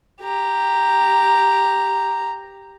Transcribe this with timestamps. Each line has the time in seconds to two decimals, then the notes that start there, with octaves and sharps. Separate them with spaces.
0.21 G4 A#5